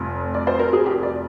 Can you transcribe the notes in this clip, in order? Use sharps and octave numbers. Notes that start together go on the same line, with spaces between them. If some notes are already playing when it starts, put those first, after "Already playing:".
Already playing: F1 F2 C3
D5
C5
A#4
G#4
G4
D5